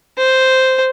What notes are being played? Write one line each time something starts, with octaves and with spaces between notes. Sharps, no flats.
C5